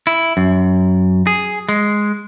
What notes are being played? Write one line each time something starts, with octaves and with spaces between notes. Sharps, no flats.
E4
F#2
G#4
G#3